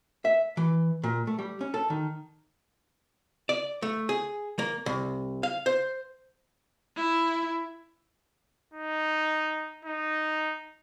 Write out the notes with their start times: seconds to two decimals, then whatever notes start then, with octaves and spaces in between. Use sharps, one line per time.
0.25 E5
0.57 E3
1.03 A#2
1.27 A3
1.39 G3
1.61 C#4
1.74 A4
1.90 D#3
3.49 D5
3.82 A3
4.09 G#4
4.59 A#3
4.86 C2
5.43 F5
5.66 C5
6.96 E4
8.74 D#4
9.85 D#4